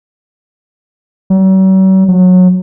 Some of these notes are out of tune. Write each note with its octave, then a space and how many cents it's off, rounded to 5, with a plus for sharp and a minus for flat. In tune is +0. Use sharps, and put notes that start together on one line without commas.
F#3 +45
F#3 -20